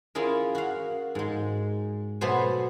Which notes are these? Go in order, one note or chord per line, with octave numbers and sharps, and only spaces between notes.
C#4 E4 F4 G#4 A#4
F#4 F5
G#2 G#3
B2 F#3 A3 B3 C5 G#5